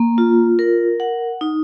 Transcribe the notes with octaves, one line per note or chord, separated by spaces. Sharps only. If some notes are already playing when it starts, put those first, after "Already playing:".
Already playing: A#3
F4
A#4
F#5
D#4